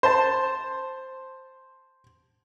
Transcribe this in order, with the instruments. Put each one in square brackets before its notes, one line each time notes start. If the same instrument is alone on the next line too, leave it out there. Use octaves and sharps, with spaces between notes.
[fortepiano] C5 A5